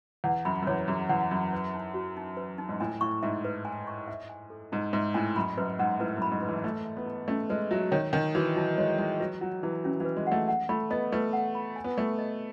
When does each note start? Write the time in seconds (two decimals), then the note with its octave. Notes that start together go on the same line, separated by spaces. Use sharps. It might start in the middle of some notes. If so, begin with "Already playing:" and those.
0.24 E2 F#5
0.45 F#2 B5
0.62 F#2
0.67 E2 C#5
0.88 F#2 G#4
1.09 E2 F#5
1.31 F#2 B5
1.53 B4
1.74 D#4
1.94 F#4
2.17 D#4
2.37 B4
2.58 D#4
2.69 G#2
2.80 A2 G#5
3.01 A2 C#6
3.23 G#2 E5
3.45 B4
3.65 G#5
3.87 C#6
4.08 E5
4.29 G#5
4.50 A4
4.72 G#2 E4
4.93 G#2 E5
5.14 A2 G#5
5.36 F#2 B5
5.57 F#2 B4
5.79 G#2 F#5
5.99 A2 B4
6.17 F#2
6.22 B5
6.32 G#2
6.42 B4
6.49 E3
6.64 A3 B4
6.86 E5
6.97 B3
7.06 E4
7.28 A3 C#4
7.50 G#3 B4
7.71 F#3 E5
7.91 D#3 C#5
8.13 D#3 D#4
8.35 E3 F#4
8.56 F#3 D#4
8.77 G#3 C#5
8.98 G#3 D#4
9.20 F#3 B4
9.41 F#3 F#5
9.63 E3 E4
9.84 F#3 C#4
10.00 E3
10.05 B4
10.16 G#3
10.27 A3 F#5
10.48 F#5
10.69 A3 B5
10.91 B3 D#5
11.12 A3 B4
11.33 F#5
11.55 B5
11.76 G#5
11.84 B3
11.98 A3 C#6
12.18 D#5